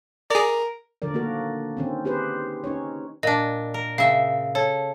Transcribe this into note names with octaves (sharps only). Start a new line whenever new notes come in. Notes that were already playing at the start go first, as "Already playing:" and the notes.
G#4 A#4 D5
D3 F3 A#4 D5
D#3 A#3 D4 F#4 A#4
D#3 C4 C#4
C4 G4 G#4 B4 C5
C#4 D#4 C#5
A#2 D4 D#5
A#4
C#3 E5 F5
A4 C#5